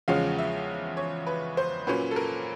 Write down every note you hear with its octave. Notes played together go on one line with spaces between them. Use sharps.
E2 C#3 F3 G#3 C#4 F5
E5
C#5
B4
C5
A#2 F#3 A#3 C#4 B4
A4
A#4